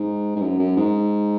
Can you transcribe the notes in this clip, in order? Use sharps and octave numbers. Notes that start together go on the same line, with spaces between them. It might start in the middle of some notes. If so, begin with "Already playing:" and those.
Already playing: G#2
G#2
F#2
F#2
G#2